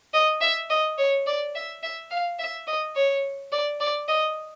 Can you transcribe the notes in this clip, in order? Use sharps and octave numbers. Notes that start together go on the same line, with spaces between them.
D#5
E5
D#5
C#5
D5
E5
E5
F5
E5
D#5
C#5
D5
D5
D#5